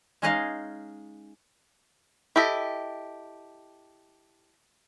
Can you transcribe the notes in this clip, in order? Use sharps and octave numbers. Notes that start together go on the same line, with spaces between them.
G#3 C#4 D#4 G#4 D#5 F5
E4 G4 A4 D#5